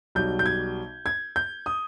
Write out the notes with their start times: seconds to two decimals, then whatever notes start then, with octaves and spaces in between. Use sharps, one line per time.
0.15 B1 B2 G3 G6
0.39 G6
0.46 G#6
1.06 G#6
1.36 G6
1.66 D#6